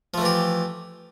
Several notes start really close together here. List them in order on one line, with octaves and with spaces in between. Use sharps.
F3 A3 E3 G4